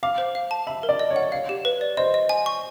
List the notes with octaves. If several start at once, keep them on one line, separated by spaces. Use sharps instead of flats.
F5 D6
C5
F5
A5
E5 B5
A#4
D5
D#5
C#5
F#5
C#5 F5
G4
B4
D5
C5 D#5
D#5
G#5
C#6